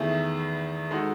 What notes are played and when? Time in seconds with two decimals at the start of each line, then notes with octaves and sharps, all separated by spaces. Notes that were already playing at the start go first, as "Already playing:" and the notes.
Already playing: E2 D#3 A3 E4 G#4
0.91 G#3 D#4 F#4 A4